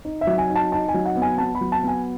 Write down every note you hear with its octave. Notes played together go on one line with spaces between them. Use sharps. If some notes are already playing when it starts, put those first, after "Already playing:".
D#4
E5
F#3
G#5
D#4
A5
D#4 A5
G#5
F#3
F#5
B3
G#5
B3 A5
B5
F#3
A5
B3 G#5